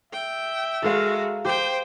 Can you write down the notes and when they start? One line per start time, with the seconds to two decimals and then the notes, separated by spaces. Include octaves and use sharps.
0.12 E5 G5
0.82 G#3 F#4 A4 A#4 F5
1.45 G4 C5 G5